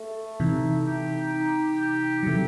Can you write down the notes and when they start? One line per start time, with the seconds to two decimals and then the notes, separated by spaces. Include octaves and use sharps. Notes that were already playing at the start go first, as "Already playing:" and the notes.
Already playing: A3
0.40 C3 E3 D#4
0.86 G4
1.34 D#4
1.80 G4
2.23 F#3
2.27 C3 E3 A3